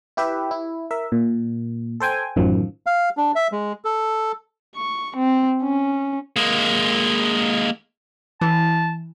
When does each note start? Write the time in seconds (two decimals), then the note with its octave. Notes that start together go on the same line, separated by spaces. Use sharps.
0.17 E4 G4 B4 E5
0.51 E4
0.91 A#4 E5
1.12 A#2
2.00 A4 C5 G5 G#5
2.36 A1 F#2 D#3 F3
2.86 F5
3.17 D4
3.35 E5
3.52 G#3
3.84 A4
4.76 C#6
5.17 C4
5.63 C#4
6.36 G#3 A#3
8.41 E3 A5